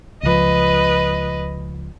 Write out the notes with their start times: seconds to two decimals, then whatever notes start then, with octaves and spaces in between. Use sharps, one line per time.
0.23 C#2 F3 B4 D#5